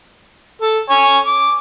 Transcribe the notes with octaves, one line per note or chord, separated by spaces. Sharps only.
A4
C#5 G#5
D6